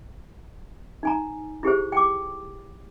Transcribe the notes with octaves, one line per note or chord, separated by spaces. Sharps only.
D#4 G#5 A#5
E4 G4 G#4 C5
G5 D6